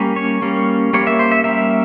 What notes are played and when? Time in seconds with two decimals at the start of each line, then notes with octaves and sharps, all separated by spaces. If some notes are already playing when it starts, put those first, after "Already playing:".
Already playing: G3 A#3 C#4
0.16 C#5
0.42 G3 A#3 C#4
0.93 G3 A#3 C#4 C#5
1.07 E5
1.19 C5
1.32 E5
1.44 G3 A#3 C#4 E5